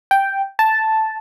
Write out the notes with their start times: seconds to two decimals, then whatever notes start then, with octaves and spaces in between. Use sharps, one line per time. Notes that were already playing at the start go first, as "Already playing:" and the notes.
0.11 G5
0.59 A5